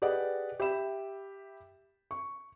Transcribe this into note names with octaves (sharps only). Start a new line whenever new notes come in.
G4 G#4 B4 D5 D#5 F#5
G4 E5 B5 E7
C#6